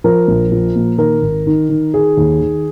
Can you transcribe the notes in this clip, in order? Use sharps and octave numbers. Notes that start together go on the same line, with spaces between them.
F3 A#4
A#1
F3
A#2
D#3 A#4
G#1
D#3
D#3
D#3 G#4
D#2
D#3